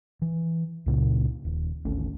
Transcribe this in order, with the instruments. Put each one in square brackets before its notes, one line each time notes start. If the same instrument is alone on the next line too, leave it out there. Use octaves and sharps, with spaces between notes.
[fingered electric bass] E3
C#2 A#2 C#3
D#1
G#1 D2 A3 C#4